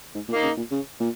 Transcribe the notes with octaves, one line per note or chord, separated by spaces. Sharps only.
G#2
A#2
A#3 D#4
C#3
A#2
C#3
A#2